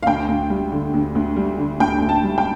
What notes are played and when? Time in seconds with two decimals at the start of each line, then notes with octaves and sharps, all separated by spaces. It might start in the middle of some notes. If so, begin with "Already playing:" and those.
0.03 F5
0.06 D2 G5
0.28 D2
0.50 G3
0.72 D3
0.94 D2
1.15 D2
1.36 G3
1.58 D3
1.80 D2 G5
2.01 D2
2.09 A5
2.23 G3
2.38 G5